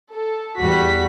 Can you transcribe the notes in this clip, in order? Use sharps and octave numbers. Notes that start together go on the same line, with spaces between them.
A4
E2 G3 F#4 B6